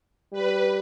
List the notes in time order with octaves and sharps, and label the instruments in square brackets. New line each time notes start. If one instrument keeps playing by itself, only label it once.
[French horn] G3 [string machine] B4